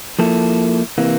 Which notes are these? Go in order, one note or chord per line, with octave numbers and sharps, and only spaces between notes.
F3 A#3 E4 A4
C3 E3 A#3